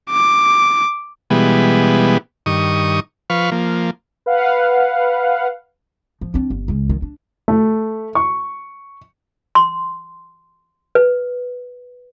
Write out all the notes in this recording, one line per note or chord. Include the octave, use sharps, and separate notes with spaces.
D6
B2 E3 G3 G#3 B3
G2 D#3 C#6 D#6
F3 B4 F5 C#6
F3 A#3
B4 F5 F#5
F3
C4 D4
G1
C#2 G#3
D#3
D4
A3
C#6
C6
B4